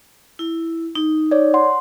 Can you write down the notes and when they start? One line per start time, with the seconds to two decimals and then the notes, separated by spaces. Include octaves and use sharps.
0.39 E4
0.95 D#4
1.31 C#5 D5
1.54 F#5 C6